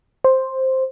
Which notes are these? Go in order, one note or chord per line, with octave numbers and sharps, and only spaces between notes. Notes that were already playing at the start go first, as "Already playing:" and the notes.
C5